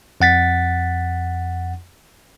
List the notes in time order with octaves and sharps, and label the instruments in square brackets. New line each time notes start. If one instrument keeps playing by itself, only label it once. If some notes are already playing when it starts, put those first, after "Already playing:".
[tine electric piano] F2 F#5 A6 B6